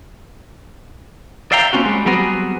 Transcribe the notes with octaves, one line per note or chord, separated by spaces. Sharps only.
D5 E5 F5 G5 A#5
G3 A#3 C4 C#4 F4 F#4
G3 G#3
F#3 G3 B3 C4 F#4 G#4